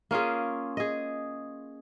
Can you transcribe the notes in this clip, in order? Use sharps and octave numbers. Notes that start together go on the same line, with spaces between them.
A#3 C#4 F4 G#4
G#4 D#5